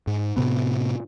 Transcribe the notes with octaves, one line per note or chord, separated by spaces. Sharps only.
G#2
A2 C3 B3